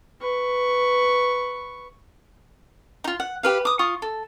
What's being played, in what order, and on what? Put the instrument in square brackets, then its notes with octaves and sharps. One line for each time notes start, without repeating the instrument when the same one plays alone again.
[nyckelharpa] B4 C#6
[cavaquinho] D#4 F4
F#5
G4 B4 F5
D6 D#6
F4 C#6 D#6
A4